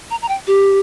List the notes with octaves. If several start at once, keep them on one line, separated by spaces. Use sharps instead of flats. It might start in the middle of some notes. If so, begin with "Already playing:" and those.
A#5
A#5
G5
G4